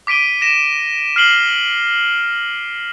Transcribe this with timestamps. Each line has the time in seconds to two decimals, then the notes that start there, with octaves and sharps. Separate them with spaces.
0.07 D6 B6 D7 D#7 G7
0.42 A#6 E7
1.16 F6 C7 F#7 G7